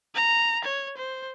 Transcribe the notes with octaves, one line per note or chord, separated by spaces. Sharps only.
A#5
C#5
C5